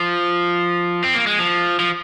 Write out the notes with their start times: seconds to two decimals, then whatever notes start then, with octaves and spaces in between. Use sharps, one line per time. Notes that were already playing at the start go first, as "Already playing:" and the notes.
Already playing: F3
1.04 C4
1.15 A#3
1.27 G#3
1.39 F3
1.80 F3